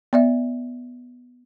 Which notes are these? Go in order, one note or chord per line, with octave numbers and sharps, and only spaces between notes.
B3 D5 E5